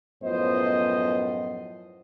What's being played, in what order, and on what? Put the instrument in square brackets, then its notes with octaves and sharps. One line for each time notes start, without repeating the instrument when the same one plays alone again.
[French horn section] F#2 A2 F3 B3 C5 D#5